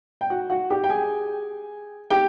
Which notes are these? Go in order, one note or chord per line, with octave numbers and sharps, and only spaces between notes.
G5
F#4 F#5
F#4 F#5
G4 G5
G5
G#4 G#5
G4 G5